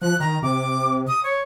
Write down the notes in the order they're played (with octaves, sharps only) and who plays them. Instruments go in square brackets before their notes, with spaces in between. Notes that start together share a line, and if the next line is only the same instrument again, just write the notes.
[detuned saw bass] F3 [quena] F#6
[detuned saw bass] D#3 [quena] A#5
[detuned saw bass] C3 [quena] D6
[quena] D#6
C#5